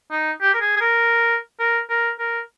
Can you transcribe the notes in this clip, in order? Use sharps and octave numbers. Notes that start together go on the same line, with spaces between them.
D#4
G4
A#4
G#4
G#4
A#4
A#4
A#4
A#4